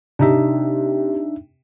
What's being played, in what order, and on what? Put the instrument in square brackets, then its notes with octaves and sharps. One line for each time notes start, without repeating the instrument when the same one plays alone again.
[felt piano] C3 [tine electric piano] D4 D#4 E5